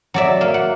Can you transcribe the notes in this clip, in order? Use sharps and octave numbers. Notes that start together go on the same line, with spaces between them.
F#3 D5 E5
A#3
F#5